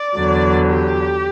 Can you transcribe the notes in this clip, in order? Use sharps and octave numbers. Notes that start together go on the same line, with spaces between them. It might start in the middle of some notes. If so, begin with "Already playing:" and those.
Already playing: D5
E2 D3 F#3
G4